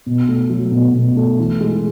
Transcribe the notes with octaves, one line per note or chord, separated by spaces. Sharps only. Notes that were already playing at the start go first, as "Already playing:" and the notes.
B2
A3
F#3
B2
B2
A3
E3
G#3